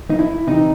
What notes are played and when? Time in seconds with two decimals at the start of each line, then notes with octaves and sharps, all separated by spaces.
0.10 D#4
0.19 E4
0.47 C3 E3 D#4